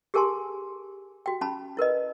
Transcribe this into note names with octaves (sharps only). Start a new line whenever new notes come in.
G4 G#4 A#4 G#5 A5 C6
F#4 G5
C#4 A5 B5
E4 A#4 B4 D#5